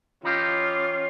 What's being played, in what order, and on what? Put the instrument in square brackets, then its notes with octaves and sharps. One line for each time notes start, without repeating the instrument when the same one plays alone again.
[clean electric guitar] E3 D#4 G4 [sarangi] C#4 [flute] F4